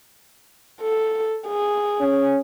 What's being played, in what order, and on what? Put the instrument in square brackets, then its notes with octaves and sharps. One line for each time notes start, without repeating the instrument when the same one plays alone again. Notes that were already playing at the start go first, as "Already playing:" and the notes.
[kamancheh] A4
G#4
[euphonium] C#4